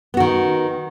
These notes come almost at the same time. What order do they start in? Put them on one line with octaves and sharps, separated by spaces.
B3 F#4 D#3